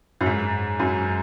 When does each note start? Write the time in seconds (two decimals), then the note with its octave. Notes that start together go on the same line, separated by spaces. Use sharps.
0.21 F#2
0.26 G#2
0.79 F#2